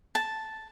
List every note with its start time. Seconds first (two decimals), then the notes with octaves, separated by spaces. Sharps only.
0.15 A5